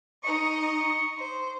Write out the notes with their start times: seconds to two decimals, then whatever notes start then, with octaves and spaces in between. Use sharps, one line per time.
0.24 D#4 D#5 C#6
1.17 C5